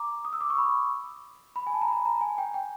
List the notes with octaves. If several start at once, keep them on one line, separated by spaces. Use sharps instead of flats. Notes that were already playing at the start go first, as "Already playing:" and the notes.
Already playing: A#5 D6
D#6
E6
D6
C#6
B5
B5
G#5
A5
A#5
B5
A#5
G#5
G5
G5